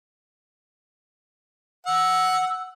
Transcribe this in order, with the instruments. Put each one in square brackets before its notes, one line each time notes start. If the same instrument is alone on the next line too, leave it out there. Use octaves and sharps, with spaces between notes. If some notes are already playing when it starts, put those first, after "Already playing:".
[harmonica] F#5 [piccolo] E6